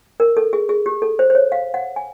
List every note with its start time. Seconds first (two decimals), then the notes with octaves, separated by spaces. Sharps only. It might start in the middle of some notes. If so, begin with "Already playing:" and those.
0.20 A#4
0.37 A4
0.53 G#4
0.69 G#4
0.86 G4
1.02 A4
1.19 C5
1.30 C5
1.35 C#5
1.52 F5
1.74 F#5
1.96 G#5